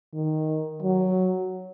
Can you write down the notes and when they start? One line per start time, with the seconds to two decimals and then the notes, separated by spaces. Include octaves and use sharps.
0.14 D#3
0.82 F#3